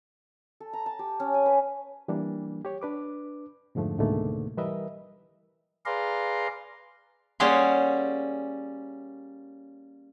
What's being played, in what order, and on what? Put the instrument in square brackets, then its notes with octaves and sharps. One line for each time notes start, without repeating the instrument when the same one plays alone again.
[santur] A4
A#5
A5
G4
C#4
G#5
B4
[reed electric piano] E3 G3 A#3 D4
G4 C#5
D4 B4 D6
F2 G#2 D3 F3 A3
C#2 G#2 B2 D3 A3 A#3
E3 G3 A#4 B4 D#5 E5
[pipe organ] G#4 B4 D5 F5 A#5 C6
[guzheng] G3 A#3 C#4 G#4 F#5 C6